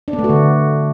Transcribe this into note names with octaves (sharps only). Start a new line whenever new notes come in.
D4
B3
A3
F#4
D3